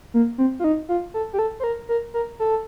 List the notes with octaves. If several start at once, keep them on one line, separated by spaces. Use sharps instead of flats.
A#3
C4
F4
D#4
F4
A4
G4
A4
C5
A#4
A#4
A#4
A4